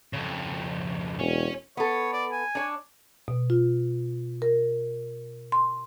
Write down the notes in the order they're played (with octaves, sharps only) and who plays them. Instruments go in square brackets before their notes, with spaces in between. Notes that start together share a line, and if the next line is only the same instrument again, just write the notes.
[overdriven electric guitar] F2 C#3
[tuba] E1 [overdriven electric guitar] C#4
[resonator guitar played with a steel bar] B3 A4 [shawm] C#5
[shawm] D5
G#5
[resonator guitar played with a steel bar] D4 C#5
[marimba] B2
F4
A#4
C6